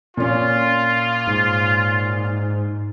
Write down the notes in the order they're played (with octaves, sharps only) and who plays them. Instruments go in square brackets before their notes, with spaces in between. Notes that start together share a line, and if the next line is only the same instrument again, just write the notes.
[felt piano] A#2 C#4 [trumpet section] F4
[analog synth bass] G#2